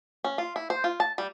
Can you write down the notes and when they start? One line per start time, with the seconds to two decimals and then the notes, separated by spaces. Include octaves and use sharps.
0.24 C#4
0.38 F4
0.56 E4
0.70 C5
0.84 F4
1.00 A5
1.18 G3